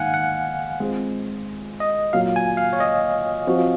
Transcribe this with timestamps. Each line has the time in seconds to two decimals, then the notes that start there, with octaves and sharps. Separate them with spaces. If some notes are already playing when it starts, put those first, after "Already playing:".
Already playing: G#2 D#3 A#3 D#4 F5 F#5 G#5
0.14 F#5
0.80 G#3 C4 F4
1.80 D#5
2.13 A#2 F#3 A#3 F5
2.36 G#5
2.57 F5
2.73 C#5
2.80 D#5
3.47 F3 C4 F#4